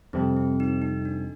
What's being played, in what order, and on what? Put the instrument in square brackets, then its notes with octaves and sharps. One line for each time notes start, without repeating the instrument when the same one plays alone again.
[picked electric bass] F2 C3 G3 [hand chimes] C4
[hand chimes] C4
D#4
D#4
D4